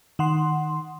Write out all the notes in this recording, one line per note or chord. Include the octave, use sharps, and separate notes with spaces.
D#3 F#5 C6